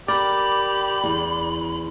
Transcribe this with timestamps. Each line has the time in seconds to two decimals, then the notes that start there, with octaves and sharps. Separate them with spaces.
0.08 G4 A#4 D5 B5
1.04 E2